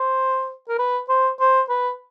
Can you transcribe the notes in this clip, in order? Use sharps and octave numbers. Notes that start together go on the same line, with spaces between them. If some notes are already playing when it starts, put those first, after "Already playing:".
Already playing: C5
A#4
B4
C5
C5
B4